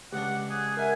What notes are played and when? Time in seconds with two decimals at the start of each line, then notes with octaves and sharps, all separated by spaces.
0.13 C#2 D4 G4 F#5
0.50 G#4 F#6
0.77 A#4 E5 F#5 G#5